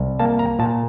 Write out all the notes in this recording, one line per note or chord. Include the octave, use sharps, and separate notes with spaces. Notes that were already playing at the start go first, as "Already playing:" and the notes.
Already playing: C2
A#3 A5
A#5
A#2 A5